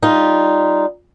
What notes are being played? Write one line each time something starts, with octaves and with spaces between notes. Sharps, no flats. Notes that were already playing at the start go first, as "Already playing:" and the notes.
G3 D#4 F4